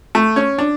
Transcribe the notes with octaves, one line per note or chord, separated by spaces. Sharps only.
A3
C#4
D4